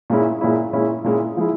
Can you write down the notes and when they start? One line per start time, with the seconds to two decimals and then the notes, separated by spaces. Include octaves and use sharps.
0.10 A#2 G#3 C#4 E4
0.41 A#2 G#3 C#4 E4
0.73 A#2 G#3 C#4 E4
1.04 A#2 G#3 C#4 E4
1.37 F3 G#3 E4